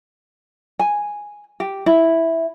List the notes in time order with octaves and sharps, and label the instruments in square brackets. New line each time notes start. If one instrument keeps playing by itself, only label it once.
[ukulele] G#5
G4
E4